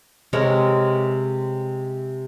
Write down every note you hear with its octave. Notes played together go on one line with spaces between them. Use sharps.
C3 G#3 A#4 C#5